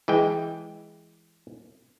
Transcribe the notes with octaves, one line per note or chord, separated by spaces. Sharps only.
E3 G#3 G5